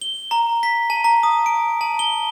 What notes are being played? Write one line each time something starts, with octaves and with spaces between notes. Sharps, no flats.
G7
A#5
B6
A5
A#5
D#6
D7
A5
G7